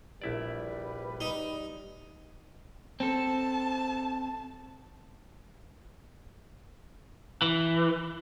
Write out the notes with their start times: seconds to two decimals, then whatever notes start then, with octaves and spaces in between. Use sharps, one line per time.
0.22 A#1 G3 E4 B4 D5
1.21 D#4
3.00 C4 A4 A5
7.42 E3